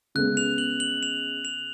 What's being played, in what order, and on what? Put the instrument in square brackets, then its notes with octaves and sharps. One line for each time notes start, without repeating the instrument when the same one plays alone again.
[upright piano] C#3 G#3 B3 [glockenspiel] F#6
[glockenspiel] F7
F#7
F#7
F7
F7